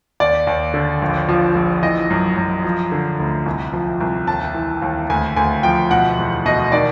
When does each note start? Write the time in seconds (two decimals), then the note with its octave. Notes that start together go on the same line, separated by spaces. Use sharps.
0.20 D#2 D5
0.47 D#2
0.74 D3
1.02 A#1
1.29 F3
1.55 A#1
1.83 E3 D#5
2.10 F#2
2.37 F#2
2.64 F3
2.92 D3
3.20 D2
3.46 C2
3.73 F3
4.01 C2
4.27 D#2 A5
4.54 E3
4.82 D#2
5.10 D2 G#5
5.36 D2 G#5
5.63 F3 G5
5.91 B2 F#5
6.18 E2
6.45 B2 D#5
6.72 D#3 D5